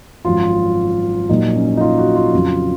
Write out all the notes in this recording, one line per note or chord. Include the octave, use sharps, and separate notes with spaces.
G#1 F#2 F3 F4
A#1 A#2 F#3 D#4
C#4
D#4
F4
F#4
F4
F2 C#3 F#3